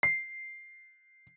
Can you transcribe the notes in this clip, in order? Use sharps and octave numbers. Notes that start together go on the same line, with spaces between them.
C7